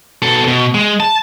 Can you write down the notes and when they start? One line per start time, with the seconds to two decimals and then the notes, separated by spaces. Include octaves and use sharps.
0.22 B2 A4
0.48 B2
0.74 G#3
1.00 A5